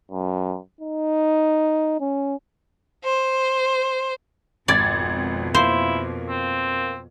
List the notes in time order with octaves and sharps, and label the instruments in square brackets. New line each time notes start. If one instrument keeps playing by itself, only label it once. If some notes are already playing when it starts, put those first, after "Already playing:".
[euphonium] F#2
D#4
C#4
[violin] C5
[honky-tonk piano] G#1 G#6 A6 [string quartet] F2 B2 [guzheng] D5
[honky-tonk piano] A#3 [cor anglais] E4 [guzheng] C5
[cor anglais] C4